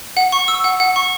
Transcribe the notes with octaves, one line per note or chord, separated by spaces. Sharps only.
F#5
C#6
E6
F#5
F#5
C#6